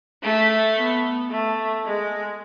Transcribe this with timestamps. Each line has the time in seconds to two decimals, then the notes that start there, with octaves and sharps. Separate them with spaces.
0.23 A3
0.77 B3
1.31 A3
1.85 G#3